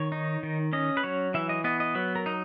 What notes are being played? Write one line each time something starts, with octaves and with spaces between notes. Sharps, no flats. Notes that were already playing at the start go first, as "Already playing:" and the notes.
Already playing: D#3 C#5
D#4
D#3
C#4 D#5
B4
F#3 C#5
E3 E5
D#5
B3 D#5
D#5
F#3 B4
A#4
D#4